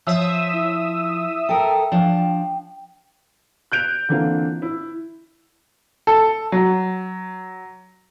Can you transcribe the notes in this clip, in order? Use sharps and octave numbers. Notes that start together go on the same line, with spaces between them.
F3 C#5 E5 D#6 E6
E4
A4 A#4 G5
F3 D4
F#6 G6 D7 F7
D3 E3 A#3 C4 F4
E4
A4
F#3